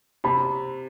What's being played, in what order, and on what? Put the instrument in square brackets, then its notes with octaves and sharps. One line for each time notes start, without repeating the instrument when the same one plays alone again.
[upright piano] C3 [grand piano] B5